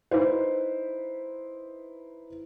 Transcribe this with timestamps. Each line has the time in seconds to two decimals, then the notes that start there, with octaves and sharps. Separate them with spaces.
0.11 D#4 E4 B4 C5